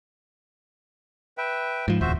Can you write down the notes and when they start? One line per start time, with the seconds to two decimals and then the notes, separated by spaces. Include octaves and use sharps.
1.38 B4 E5 G5
1.88 G#2 F3
2.01 D1 E2 F#4 C5 E5